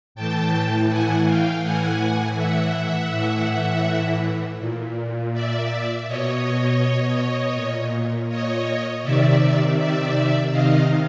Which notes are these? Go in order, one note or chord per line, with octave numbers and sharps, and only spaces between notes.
A2 E3 G5 A5
F#5 G#5
F5 G5
A2 E3 F#5 G#5
E5 F#5
A2 E3
A#2
D5 E5
B2 C#5 D#5
A#2
C#5 D#5
C3 D#3 D5 E5
D5 E5
C3 D#3 D#5 F5